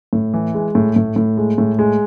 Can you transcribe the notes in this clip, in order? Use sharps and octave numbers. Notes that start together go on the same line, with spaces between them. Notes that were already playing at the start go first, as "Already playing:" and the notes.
A2
E3
G#3
A2
A2
A2
G#3
A2
G#3